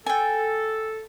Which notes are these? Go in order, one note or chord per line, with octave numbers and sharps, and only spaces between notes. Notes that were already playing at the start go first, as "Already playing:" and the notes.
A4 G5 G#5